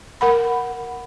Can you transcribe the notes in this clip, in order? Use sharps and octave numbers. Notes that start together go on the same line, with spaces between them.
A#4 F#5 B5